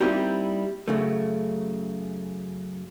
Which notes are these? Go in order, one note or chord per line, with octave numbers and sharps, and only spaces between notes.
G3 A#3 C4 D#4 E4 G4
F#2 C#3 A3